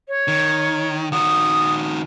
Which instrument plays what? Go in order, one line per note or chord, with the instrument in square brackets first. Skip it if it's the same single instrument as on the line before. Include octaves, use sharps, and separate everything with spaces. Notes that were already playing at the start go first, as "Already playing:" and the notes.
[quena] C#5
[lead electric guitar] D#3
[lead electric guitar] D#3 F#4 [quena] D#6